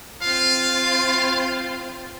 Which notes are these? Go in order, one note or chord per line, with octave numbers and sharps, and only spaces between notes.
C4 F4 F5